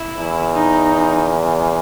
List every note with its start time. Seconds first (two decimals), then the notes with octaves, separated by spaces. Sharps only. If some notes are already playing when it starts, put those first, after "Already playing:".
Already playing: E4
0.16 E2
0.54 D#4